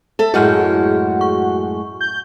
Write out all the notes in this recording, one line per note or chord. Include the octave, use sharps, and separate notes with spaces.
A4 E5
F#2 A2 G#3 F#4 G#4 F6 G6
C#6
G6